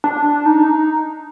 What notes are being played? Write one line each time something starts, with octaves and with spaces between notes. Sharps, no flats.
D4
D#4